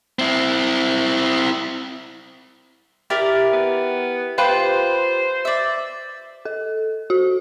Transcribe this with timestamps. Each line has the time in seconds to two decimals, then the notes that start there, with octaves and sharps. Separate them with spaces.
0.19 C4 E4
3.10 E4 G4 A#4 D5
3.53 B3
4.38 F4 G4 B4 C5
5.45 D5 E5
6.45 A4
7.10 F#4